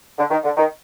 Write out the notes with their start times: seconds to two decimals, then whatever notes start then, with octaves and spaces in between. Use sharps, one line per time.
0.19 D3
0.31 D#3
0.44 D3
0.57 D#3